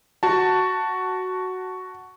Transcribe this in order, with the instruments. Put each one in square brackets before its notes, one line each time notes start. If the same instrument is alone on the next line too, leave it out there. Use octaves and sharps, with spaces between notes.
[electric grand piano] F#4 A5